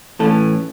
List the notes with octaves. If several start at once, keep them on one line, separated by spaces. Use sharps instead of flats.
A2 E3 A3 C#4 A4